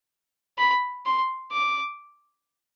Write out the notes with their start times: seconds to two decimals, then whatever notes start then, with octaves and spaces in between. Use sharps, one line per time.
0.58 B5
1.06 C6
1.53 D6